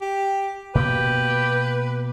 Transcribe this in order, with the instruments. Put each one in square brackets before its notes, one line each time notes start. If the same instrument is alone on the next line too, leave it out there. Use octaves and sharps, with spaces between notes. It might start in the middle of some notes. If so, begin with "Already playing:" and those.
[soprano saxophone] G4
[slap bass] B2 A#3 B3 [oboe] G4 [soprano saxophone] B4